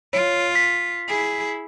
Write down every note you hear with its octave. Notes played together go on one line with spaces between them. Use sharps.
F4 C#5
B6
E4 G#4